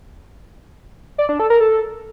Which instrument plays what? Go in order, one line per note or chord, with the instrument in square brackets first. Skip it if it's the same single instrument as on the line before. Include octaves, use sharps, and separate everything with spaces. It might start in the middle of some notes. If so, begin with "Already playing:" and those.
[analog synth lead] D5
D4
A4
A#4
A4